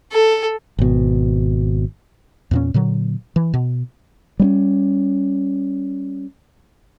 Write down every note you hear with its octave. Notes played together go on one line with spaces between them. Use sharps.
A4
G#1 B2
E2 A#2 C#4
A#2 D3 F#3
E3
B2
G3 C4 C#4